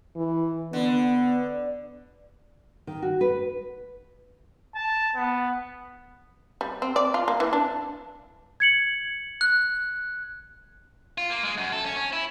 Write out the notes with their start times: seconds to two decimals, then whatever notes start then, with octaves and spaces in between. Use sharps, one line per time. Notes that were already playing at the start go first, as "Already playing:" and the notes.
0.16 E3
0.73 D3 B3
2.87 D#3
3.02 F#4
3.21 B4
4.75 A5
5.15 B3
6.61 G3
6.82 C4
6.96 D5
7.14 F4
7.28 A#3
7.40 E3
7.53 D4
8.60 G#6 C#7 F#7
9.41 F#6
11.18 F4
11.30 A#3
11.44 G#3
11.58 F#2
11.72 A4
11.84 C#4
11.97 C#4
12.13 E4